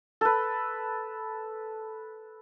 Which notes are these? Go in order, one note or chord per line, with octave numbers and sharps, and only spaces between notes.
A4 B4